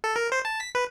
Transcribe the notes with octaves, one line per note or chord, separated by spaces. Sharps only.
A4
A#4
C5
A5
B6
B4